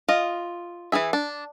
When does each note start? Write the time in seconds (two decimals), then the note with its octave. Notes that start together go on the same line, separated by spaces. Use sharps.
0.08 F4 D#5
0.92 E3 E4 G#4 E5
1.13 D4